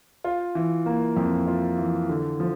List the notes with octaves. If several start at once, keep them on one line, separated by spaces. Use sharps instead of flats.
F4
E3
A#3
F2
F4
E3
D3
F3